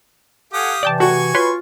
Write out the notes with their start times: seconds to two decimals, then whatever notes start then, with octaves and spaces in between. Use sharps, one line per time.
0.53 G4 A4 F5 F#5 G#5 D#6
0.83 C3 E3 D5 G5 A5
1.00 F#4 G#5 C#6
1.35 F4 B4 C#5 C6